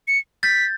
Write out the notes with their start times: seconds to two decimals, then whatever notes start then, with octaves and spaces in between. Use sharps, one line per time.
0.08 C#7
0.43 G6 A6 B6